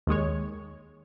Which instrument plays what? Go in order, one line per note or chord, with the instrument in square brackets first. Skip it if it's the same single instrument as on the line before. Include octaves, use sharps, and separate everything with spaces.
[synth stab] D#2 D#3 G#3 C#5